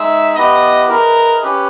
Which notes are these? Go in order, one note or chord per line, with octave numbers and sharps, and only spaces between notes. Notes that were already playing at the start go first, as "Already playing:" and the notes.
Already playing: G#3 D#4 G#4 E5
B3 E4 G4 B4 D#5
E4 G#4 A#4 B4 D#5
C#4 G4 B4